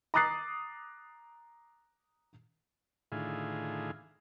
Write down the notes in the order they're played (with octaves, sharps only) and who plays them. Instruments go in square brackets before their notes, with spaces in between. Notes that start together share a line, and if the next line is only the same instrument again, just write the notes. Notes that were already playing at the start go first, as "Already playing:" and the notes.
[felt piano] A#5 D6 D#6 F#6 A6 C7
[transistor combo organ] A2 D3 D#3 E4 F4 G#4